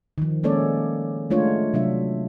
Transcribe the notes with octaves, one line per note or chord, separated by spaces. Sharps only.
D#3 F3
G#3 A#3 C#4 A4 C#5 D5
G#3 A3 D4 F4 C#5
C3 F#3 D4 E5